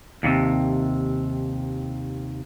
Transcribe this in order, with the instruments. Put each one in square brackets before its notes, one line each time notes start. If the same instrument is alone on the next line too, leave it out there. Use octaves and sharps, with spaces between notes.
[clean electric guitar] D#2 A2 C3